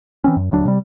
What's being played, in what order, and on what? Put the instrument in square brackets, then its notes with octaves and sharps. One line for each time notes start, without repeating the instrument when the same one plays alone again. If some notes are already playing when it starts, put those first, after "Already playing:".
[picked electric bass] E3 C4 C#4
F#2
D#1 D2 F#3 D4
C3 G3